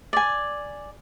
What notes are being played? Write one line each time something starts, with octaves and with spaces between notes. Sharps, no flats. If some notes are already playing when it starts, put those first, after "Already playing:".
D5 G#5